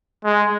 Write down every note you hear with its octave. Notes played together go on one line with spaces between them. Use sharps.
G#3